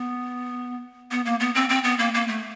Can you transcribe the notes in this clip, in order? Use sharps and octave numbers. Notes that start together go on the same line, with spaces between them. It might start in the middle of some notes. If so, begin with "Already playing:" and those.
Already playing: B3
B3
A#3
B3
C4
C4
B3
A#3
A#3
A3